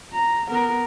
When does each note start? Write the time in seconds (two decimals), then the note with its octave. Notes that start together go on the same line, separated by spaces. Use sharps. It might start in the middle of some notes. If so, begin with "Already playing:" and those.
0.13 A#5
0.49 B3 A#4